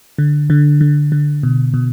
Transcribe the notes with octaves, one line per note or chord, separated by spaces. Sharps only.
D3
D3
D3
D3
B2
B2